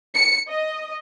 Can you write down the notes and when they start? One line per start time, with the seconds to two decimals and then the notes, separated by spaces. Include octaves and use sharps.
0.15 C#7
0.48 D#5